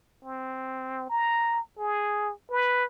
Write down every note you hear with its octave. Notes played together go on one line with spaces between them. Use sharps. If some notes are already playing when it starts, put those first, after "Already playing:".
C4
A#5
G#4
B4